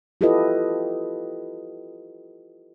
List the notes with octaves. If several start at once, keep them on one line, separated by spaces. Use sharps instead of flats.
E4 F4 G4 A4 B4 D#5